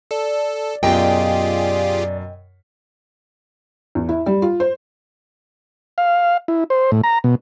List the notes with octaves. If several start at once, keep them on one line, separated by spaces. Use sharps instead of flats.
A4 D5
F#2 B2 F4 G4 G#4 D#5 G5
E2
E4
G3
F4
C5
F5
E4
C5
A2
A#5
B2